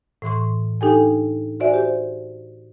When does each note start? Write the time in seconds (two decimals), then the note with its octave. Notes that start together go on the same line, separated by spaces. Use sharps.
0.22 A2 E3 C6 C#6
0.81 D4 D#4 G4 A4 G5 G#5
1.60 F#4 C5 D5 E5 G#5
1.74 G4 C5